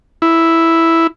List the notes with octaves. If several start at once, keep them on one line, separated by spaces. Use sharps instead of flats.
E4